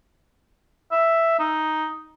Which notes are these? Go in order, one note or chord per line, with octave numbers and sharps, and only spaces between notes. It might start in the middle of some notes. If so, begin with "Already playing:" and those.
E5
D#4